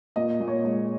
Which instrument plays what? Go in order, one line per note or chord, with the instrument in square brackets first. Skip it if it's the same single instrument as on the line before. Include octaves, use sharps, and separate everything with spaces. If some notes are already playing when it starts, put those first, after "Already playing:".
[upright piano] A#2 D#5
A#2
C#5
G#3 D#5